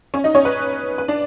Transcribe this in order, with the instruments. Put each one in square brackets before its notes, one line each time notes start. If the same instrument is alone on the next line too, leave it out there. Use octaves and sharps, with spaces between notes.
[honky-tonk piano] C#4 C#5
D#4 D#5
C#4 C#5
B4
B4
D4 D5